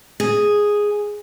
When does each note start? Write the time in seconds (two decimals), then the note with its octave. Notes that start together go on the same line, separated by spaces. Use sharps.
0.20 G#4